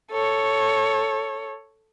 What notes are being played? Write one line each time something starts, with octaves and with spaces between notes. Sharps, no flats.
A4 C#5